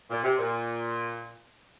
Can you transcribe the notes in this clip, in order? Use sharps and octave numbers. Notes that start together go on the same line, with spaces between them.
A#2
C3
A#2